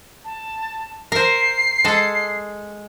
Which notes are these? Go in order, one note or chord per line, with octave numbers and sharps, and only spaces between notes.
A5
A#4 C5 C7
G#3 A4